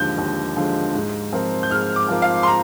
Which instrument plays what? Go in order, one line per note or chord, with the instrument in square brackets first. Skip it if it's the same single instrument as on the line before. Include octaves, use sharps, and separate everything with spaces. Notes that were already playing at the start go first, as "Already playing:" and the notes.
Already playing: [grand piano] D#2 D3 F3 G#3 [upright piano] G6
[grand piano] D#2
D3 F3 G#3
G#2
F3 C4 F4 A#4
[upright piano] G6
[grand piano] G#2 [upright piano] F6
[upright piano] D6
[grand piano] F3 C4 F4 A#4
[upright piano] F5
C6
A#5